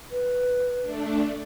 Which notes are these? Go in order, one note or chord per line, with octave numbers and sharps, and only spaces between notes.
B4
A3 D4